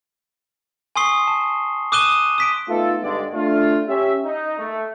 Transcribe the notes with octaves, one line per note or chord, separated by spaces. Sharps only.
G#5 C6 C#6 D#6 C7 G7
A5
D6 D#6 F#6 D#7 E7 G7
D#6 B6 D7
A3 B3 D#4 F4 A4
G2 D3 G#3 D5
A3 D4 F4
C#4 G4 E5
D#4
A3